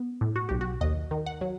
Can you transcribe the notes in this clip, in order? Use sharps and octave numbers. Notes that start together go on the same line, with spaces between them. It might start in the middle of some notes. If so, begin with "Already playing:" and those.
Already playing: B3
A2
F#4
B1 G4
F#4
D#2 D#5
D#3
F#5
F#3